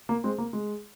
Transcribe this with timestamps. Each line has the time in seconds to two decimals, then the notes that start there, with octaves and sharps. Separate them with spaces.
0.09 A#3
0.24 G#3 C4
0.38 A#3
0.53 G#3